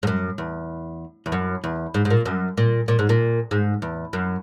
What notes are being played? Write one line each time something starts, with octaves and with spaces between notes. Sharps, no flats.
G#2
F#2
E2
E2
F#2
E2
G#2
G#2
A#2
F#2
A#2
A#2
G#2
A#2
G#2
E2
F#2